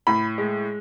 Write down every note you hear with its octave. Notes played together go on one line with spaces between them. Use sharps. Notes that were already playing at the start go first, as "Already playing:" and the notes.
A2 B5
G#3